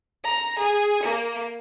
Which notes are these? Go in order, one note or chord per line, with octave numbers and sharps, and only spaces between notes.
A#5
G#4
A#3